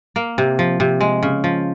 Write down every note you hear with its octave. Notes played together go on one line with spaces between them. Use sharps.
A#3
C3
F3
C3
G#3
C#3
F3